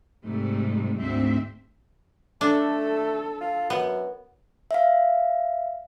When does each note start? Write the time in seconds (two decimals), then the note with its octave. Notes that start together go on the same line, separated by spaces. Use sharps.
0.25 G#2 C3 G3 A3
1.00 D2 G#2 A3 C4 E5
2.41 A3 D4 A4
3.41 F4
3.70 F#2 B3
4.71 E5 F5